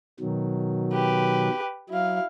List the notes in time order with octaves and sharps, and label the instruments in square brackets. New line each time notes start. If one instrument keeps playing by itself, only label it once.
[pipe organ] B2 D#3 F#3
[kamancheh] G4 B4
[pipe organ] F#3 [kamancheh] E4 F5